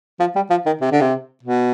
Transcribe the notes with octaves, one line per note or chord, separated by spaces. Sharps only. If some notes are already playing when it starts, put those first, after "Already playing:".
F3
G3
F3
D#3
C3
D3
C3
B2